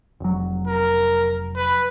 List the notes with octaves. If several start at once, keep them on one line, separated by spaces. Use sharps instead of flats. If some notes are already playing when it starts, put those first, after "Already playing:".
F1 F#3
A#4
B4